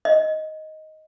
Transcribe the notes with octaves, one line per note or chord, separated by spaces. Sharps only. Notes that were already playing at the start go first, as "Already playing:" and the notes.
D#5